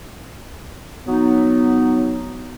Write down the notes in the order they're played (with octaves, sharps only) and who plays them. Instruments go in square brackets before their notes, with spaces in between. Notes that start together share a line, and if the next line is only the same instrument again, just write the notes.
[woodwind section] F#3 B3 D#4